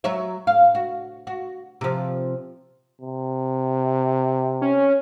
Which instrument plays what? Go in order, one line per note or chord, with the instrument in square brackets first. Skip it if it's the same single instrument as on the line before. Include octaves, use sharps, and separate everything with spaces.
[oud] F#3 C#5 E5
F5
F#4
F#4
C3 F3
[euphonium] C3
[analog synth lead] C#4